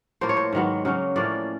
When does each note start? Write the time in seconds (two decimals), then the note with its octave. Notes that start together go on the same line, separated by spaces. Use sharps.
0.21 A2 F3 A#3 C5
0.29 C#5
0.37 C5
0.52 G#2 D#3 F#3 B3
0.85 C#3 F#3 A#3 C#4
1.16 A2 F3 A#3 C#4 D5